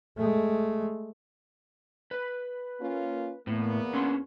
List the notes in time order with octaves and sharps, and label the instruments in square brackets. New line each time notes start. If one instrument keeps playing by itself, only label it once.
[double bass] G#3 A3
[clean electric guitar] B4
[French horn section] A#3 C#4 F4
[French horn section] E2 A#3 B3 [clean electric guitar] A2
[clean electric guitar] C#4 D4 C6